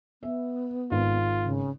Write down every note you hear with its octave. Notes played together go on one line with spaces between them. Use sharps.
B3 E5
G#1 F4
C#3